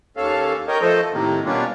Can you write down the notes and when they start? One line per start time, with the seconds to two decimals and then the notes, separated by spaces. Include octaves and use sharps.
0.17 D#2 C#4 A4 F5
0.68 G4 A#4 C#5 D#5
0.81 F3 A3 A4 C5 D#5
1.13 A2 C3 D#3 A#3
1.45 B2 G3 A#3 C#4 D4 F4